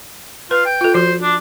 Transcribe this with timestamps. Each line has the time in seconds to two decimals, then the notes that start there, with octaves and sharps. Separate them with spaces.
0.51 F4 B4
0.66 G5
0.81 F4 A4
0.94 F3 F#4 C5
1.22 D4